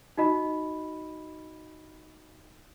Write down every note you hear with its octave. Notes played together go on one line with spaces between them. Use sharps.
D#4 F#4 D#5 B5